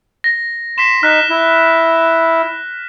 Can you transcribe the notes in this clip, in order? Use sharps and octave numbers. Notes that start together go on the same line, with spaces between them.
A#6
C6 B6 E7
D#4 F6 F#6 B6
E4